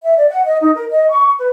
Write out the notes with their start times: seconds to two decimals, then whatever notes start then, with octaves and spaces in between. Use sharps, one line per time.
0.04 E5
0.17 D5
0.29 F#5
0.46 D#5
0.61 D#4
0.76 A#4
0.91 D#5
1.10 C#6
1.37 B4